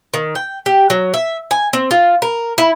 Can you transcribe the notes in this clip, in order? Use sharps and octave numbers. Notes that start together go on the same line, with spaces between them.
D#3
G5
G4
F#3
E5
G#5
C4
F4
A#4
E4